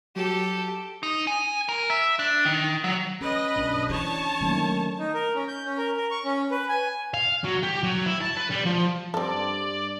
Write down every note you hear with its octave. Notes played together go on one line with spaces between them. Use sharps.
F#3 G4 A4 A5
D#4
G#5
A#4
E5
D4
D#3
F#3
C#4 B4 D#5
B1 G2 D4
E3 C#5 A5
D#3 F#3 A3 A#3 C#4
D#4
A#4
C#4
G6
C#4
A#4
A#4
C#6
C#4
B4
G#5
F5
F#3
G4
F#3
E4
A5
B4
G3
F3
G2 C4 A4 D5